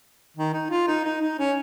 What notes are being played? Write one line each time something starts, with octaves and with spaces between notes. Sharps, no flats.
D#3
D#4
F4
D#4
D#4
D#4
C#4